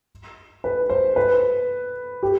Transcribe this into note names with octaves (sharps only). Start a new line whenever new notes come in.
B4
C5
B4
G4